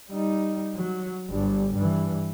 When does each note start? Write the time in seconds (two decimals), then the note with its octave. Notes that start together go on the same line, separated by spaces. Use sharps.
0.10 G3 D#4
0.76 F#3
1.30 G1 G2
1.74 G2 E3